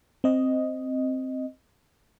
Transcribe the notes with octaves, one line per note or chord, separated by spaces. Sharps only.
C4 D#5